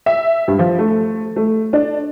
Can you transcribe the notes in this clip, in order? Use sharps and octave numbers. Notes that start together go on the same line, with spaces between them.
E5
G2
F3
A3
A3
D4